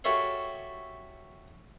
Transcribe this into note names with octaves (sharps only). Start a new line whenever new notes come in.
F#4 G4 A4 C#5 E5 F5